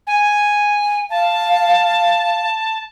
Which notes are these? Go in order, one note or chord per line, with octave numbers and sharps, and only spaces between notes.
G#5
F5 A5